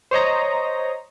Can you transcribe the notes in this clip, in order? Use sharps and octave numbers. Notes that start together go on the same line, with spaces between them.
C5 C#5 D#5 A#5